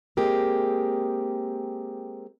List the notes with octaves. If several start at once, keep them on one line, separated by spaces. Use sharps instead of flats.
G#3 A#3 C4 G4 G#4 A#4